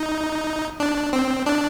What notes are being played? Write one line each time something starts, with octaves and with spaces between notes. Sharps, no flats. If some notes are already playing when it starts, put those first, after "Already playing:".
Already playing: D#4
D4
C4
D4